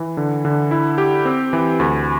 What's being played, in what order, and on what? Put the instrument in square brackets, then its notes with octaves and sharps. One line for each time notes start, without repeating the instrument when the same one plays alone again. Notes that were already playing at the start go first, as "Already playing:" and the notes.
Already playing: [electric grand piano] E3
D3
D3
E4
G4
C4
E3
D2